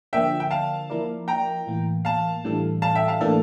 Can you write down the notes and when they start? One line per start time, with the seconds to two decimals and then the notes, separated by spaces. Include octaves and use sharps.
0.13 D3 F3 A#3 D4 E5 G5
0.40 G5
0.51 F5 A5
0.90 F3 A#3 E4 A#4 D5
1.28 G5 A#5
1.67 A2 E3 A#3
2.05 F5 A5
2.44 A2 E3 G3 D4 A4
2.82 F5 A5
2.95 E5 G5
3.08 F5 A5
3.21 A2 E3 A#3 D4 A4